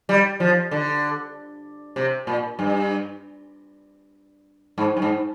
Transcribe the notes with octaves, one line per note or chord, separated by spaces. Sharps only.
G3
F3
D3
C3
A#2
G2
G#2
G2
G#2